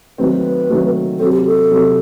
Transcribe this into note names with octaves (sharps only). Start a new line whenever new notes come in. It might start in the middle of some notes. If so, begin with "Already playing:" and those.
D#3 F#3 A3 C4 B4
D#3 F#3 A3 C4
C3 F#3 C4 A4
G4
A4
C3 F#3 C4